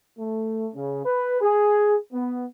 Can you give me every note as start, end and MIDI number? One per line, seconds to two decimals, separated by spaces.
0.19 0.68 57
0.75 1.01 49
1.05 1.41 71
1.41 1.96 68
2.12 2.44 59